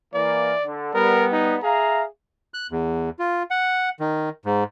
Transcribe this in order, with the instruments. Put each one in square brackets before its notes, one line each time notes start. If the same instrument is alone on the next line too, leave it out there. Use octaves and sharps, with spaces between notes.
[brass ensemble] E3 A#3 [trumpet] D5
[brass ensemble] D3
[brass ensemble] G3 B3 [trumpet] A#4
[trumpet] D#4
[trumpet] G#4 [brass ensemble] E5 F5 A#5
[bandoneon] F#6
E2
F4
F#5
D#3
G#2